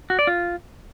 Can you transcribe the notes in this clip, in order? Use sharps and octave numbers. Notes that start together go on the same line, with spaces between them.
F#4
D5
F4